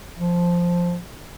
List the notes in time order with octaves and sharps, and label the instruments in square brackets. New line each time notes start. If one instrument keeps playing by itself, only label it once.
[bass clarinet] F3